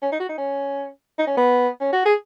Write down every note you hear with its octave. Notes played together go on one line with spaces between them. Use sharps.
C#4
D#4
F#4
D#4
C#4
D#4
C#4
B3
C#4
F#4
G#4